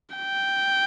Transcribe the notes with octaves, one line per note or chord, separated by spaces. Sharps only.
G5